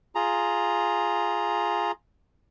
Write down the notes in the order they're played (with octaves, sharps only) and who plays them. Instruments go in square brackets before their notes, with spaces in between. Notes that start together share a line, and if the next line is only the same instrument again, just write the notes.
[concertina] F4 G#4 A#5